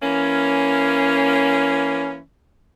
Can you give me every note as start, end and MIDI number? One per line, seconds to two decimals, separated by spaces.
0.02 2.19 52
0.02 2.19 58
0.02 2.19 61